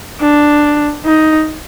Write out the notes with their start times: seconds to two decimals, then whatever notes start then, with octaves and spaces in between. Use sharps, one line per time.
0.21 D4
1.06 D#4